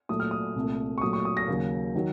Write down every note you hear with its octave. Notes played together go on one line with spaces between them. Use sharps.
A#2 F#3 A3 D#6
F6
D#6
C2 A#2 A3
C#6
A#2 F#3 A3 D#6
C#6
D#6
A#6
D#2 C#3 F#3
D#3 F#3